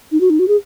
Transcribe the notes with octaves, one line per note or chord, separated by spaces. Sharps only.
D#4
F#4
D#4
F#4
G#4